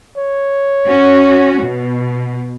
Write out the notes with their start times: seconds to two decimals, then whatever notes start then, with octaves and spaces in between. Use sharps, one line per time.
0.17 C#5
0.87 C#4 F#4
1.64 B2